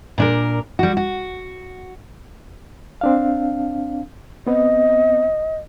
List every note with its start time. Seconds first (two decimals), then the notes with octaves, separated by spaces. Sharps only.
0.18 A#2 D4 A#4
0.79 G3 F#4
0.97 F#4
3.01 C4 D4 F5
4.47 B3 C4 D#5